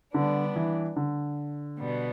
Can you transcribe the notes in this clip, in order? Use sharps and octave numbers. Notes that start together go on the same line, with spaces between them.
D3 G3 B3 D4
E3
D3
B2 G3 B3